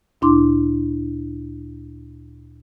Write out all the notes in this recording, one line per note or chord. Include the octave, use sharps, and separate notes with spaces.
D2 A#2 D4 E4 C6 D6